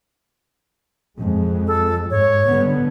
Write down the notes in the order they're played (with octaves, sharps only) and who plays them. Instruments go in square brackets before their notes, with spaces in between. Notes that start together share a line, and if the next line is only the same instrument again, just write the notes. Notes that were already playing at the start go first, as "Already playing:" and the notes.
[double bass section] F2 G#3
[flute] A4
[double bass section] G#2 [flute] C#5
[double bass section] D3 G3 B3